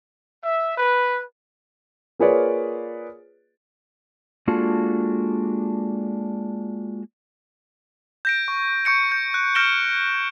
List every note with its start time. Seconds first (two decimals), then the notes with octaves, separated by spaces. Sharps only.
0.43 E5
0.78 B4
2.19 A#3 F4 G#4 B4 C#5 D5
4.48 G#3 A#3 D4 F4 F#4 A4
8.25 G6 A#6 D7
8.48 C#6
8.85 C#6 G6 C#7 D7
9.12 G6
9.34 F#6
9.55 F6 G6 A#6 D7 E7 G7